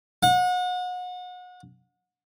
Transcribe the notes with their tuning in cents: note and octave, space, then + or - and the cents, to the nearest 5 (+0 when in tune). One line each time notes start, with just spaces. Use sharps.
F#5 -35